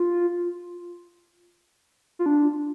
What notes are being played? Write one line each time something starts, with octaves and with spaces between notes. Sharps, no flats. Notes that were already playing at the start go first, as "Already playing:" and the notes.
Already playing: F4
F4
D4